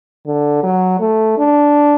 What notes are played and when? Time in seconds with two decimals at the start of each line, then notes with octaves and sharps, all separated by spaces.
0.26 D3
0.63 F#3
1.00 A3
1.38 D4